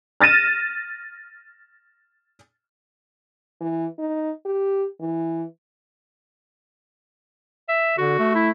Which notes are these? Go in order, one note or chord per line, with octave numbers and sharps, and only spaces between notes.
F6 A6 A#6 D#7 E7
E3
D#4
G4
E3
E5
D3 F#4
A3
E4